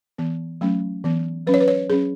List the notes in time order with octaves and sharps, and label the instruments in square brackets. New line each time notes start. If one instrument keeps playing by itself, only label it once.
[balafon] E3 B3
F#3 A3 C#4
E3 B3
F#3 C#4 B4
C#5
B4
C#5
F#3 C#4 G#4